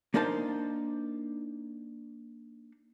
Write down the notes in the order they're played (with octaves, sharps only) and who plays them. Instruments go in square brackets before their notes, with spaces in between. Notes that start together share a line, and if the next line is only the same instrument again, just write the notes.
[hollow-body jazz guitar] A#3 D4 D#4 A#4 C5 A5